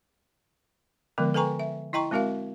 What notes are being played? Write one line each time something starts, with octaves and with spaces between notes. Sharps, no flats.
D3 F3 G#3 B3 A#4
A4 B4 G5 G#5 A#5 C#6
E5
E4 D#5 G5 A#5 C#6
G#3 C4 F#4 A#4 E5 F5